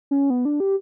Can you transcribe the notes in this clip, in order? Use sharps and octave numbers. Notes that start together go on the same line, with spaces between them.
C#4
B3
D4
G4